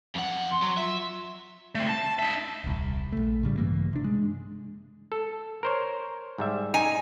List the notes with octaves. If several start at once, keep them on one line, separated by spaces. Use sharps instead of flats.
F2 F#5
C6
F#3
F4 E5
A3 C4
A5
D#4 E5
D#1 C2
A#1 A3
A2 C#3 G3
G2 C#3 E3 A#3
C3 D4
G#3
A4
A#4 C5 C#5
G#2 G3 E5
D#4 G#5